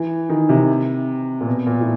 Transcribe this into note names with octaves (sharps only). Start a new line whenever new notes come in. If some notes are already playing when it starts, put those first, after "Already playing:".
Already playing: E3
D#3
C3
A#2
B2
A#2
A2